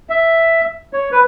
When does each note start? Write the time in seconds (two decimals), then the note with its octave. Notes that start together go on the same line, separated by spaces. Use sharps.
0.10 E5
0.93 C#5
1.12 B4